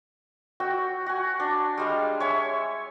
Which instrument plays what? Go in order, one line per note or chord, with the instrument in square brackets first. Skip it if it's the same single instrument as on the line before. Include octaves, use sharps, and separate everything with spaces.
[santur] F#4 G5 E6
F#4 G#5
D4
G3 G#3 F5
C#5 E5 G#5